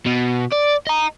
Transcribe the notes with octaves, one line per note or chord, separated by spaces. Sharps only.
B2
D5
D#5 A#5